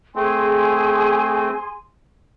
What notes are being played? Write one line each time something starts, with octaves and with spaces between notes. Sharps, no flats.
A3 C4 G#4 G#5 C6